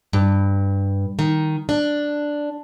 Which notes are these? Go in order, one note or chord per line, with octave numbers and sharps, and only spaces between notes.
G2
D#3
D4